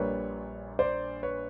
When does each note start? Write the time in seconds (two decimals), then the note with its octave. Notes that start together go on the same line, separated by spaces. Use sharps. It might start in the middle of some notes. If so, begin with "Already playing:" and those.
Already playing: A#1 A#2 G3 A#3 B4 C#5
0.79 C5 D5
1.23 B4 C#5